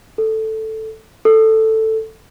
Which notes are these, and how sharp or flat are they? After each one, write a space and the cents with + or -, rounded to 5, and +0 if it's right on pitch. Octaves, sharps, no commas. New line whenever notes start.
A4 +0
A4 +5